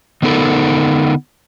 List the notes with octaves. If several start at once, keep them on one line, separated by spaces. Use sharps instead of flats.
D3 B3 D#4 A4 A#4